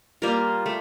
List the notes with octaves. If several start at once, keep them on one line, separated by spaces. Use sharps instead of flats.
G3 A#3 F4 A#4
A3